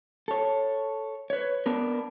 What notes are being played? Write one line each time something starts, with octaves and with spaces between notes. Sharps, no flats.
A4 C#5
B4 C#5
B3 D4 A#4